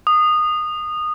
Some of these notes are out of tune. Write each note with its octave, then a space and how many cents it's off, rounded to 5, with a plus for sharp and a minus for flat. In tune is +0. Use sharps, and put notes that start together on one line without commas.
D#6 -20